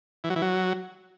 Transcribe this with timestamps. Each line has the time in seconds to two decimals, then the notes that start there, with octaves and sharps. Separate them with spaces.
0.24 E3
0.30 F#3
0.36 E3
0.42 F#3